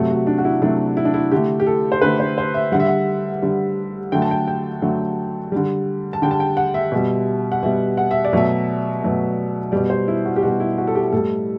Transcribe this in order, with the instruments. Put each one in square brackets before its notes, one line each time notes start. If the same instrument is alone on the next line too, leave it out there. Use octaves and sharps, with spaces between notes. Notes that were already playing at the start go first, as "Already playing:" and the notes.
Already playing: [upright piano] C3 F#3 A3
F#4
D4
F#4
E4
C3 F#3 A3 D4
E4
D4
E4
D3 A3 G4
G4
A4
C5
D3 A3 B4
C5
C5
E5
D3 G3 F#5
E5
F#5
D3 G3
D3 F#3 A3 G5
A5
G5
G5
D3 F#3 A3
D3 G3
A5
D3 G3 G5
A5
G5
F#5
E5
B2 G3
F#5
B2 G3 E5
F#5
E5
D5
B2 F#3 A3 E5
B2 F#3 A3
B2 G3 D5
C5
E4
F#4
G4
B2 G3 F#4
E4
F#4
A4
G4
A2 G3 A4